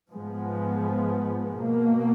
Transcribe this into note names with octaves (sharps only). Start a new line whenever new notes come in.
G#2 F3 G#3 B3
B2 A#3